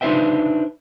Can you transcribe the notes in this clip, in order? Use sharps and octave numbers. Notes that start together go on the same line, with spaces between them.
D4 D#4 B4 C5 E5 G5